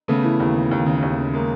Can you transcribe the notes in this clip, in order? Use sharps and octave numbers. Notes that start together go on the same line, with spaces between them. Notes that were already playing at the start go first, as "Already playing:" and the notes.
C#3 A3 B3
E3
D#2
C#3
D#2
C#3
D#2
C#3
G#3 A#3